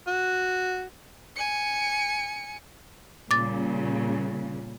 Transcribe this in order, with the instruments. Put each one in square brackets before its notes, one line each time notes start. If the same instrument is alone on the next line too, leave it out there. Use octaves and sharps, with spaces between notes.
[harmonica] F#4
[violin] G#5 C#7
[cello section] A#2 C#3 G3 [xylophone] D6 A6